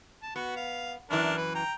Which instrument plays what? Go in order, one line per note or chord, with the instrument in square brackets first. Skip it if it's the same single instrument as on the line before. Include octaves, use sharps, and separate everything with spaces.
[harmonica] A5
[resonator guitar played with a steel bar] B3 [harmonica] F#4
[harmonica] F5
[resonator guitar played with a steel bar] F#2 E3 [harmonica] D4 A#4
[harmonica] B4
G5 A#5